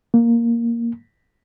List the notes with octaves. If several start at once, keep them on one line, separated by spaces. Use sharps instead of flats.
A#3